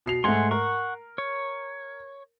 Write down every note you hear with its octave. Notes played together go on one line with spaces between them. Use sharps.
B2 C7 F7
G#2 A3 F#5 G#5 C6
A#4 F#5 C#6
C#5